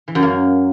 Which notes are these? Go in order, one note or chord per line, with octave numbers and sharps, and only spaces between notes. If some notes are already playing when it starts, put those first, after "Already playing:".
E3
F#2
A#3